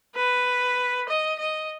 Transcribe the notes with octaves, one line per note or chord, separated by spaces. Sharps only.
B4
D#5
D#5